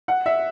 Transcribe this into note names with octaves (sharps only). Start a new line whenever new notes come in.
F#5
E5